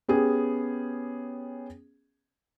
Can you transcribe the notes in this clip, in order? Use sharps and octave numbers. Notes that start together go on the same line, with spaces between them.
B3 C#4 G4 G#4